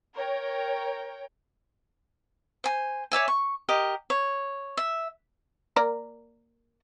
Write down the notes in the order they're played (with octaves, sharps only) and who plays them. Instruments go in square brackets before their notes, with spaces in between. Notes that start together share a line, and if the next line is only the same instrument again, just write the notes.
[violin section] A#4 C#5 G5
[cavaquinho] C5 G#5
C#5 D5 E5 G#5
C#6
G4 A#4 D#5
C#5
E5
[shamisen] A#3 A#4 D5